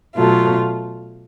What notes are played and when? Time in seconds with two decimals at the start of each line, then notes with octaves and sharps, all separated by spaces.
0.16 B2 F#3 A3 F4